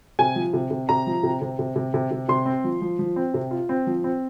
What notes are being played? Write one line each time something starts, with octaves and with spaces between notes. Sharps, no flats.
C3 G#5
F3
C3
C3
C3 A#5
F3
C3
C3
C3
C3
C3
C3
C3 C6
C4
F3
F3
F3
C4
C3
F4
C4
F3
C4